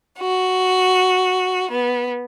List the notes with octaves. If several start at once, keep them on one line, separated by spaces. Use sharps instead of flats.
F#4
B3